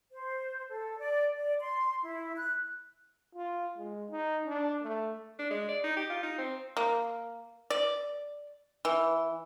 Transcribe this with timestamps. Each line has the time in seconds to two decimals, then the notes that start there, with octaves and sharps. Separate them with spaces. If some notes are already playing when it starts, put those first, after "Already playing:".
0.12 C5
0.70 A4
0.99 D5
1.37 D5
1.60 C6
2.03 E4
2.37 F#6
3.36 F4
3.77 G#3
4.10 D#4
4.46 D4
4.83 A3
5.39 D4
5.50 G#3
5.68 D5
5.84 D#4
5.97 G4
6.10 F4
6.23 D#4
6.38 C4
6.77 A#3
7.70 D5
8.85 E3